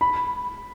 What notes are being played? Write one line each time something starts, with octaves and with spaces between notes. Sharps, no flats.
B5